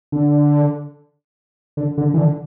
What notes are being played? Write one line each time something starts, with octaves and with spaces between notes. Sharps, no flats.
D3
D3
D3
E3
D3